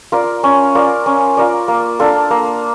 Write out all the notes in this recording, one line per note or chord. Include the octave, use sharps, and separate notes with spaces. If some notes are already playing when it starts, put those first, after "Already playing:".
F4 A#4 D5
C#4
F4 A#4 D5
C#4
F4 A#4 D5
A#3
D4 F4 A4
A#3